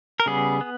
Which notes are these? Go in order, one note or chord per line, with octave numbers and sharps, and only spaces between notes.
A#4
C#3 G3 B3 G#4
B3